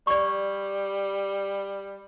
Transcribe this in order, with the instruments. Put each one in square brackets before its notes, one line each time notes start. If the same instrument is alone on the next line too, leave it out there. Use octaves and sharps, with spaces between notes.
[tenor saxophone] G3 [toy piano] D5 C#6